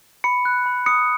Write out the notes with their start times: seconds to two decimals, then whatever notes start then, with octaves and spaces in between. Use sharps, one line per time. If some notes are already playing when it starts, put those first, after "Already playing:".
0.24 B5 C#7
0.45 F#6
0.66 B5
0.86 D#6 C#7